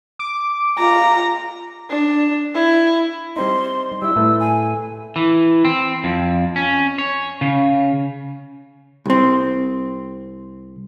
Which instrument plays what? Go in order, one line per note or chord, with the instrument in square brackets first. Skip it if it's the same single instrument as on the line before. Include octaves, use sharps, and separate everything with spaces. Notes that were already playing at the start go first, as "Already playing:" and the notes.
[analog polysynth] D6
[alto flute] F4 [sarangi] A#5
[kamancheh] D4
E4
[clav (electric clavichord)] G3 C4 D#4 [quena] C6
[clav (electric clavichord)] G3 E4 [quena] E6
[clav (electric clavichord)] A2 A3 B4
[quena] G#5
[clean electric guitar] E3
C4
F2
C#4
C#5
C#3
[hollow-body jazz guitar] C2 C4